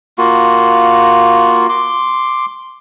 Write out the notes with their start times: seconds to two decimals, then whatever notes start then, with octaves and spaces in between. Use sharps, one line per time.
0.18 A#3 F4 F#4
1.69 C6 D6